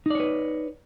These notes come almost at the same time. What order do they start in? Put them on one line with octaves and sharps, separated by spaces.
D#4 D5 C#5 B4